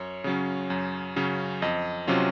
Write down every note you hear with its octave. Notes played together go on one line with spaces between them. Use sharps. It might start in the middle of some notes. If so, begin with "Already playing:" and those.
Already playing: F#2 C#5
C#3 F#3 C#4
F#2
C#3 F#3 C#4
F2 D#5
C3 F#3 C#4 F4